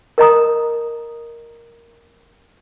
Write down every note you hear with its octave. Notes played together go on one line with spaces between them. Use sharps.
A#4 D#5 A#5 D#6